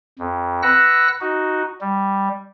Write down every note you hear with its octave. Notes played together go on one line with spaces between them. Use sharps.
F2
B4 F#5 E6 F#6 A#6
D#4 F#4
G3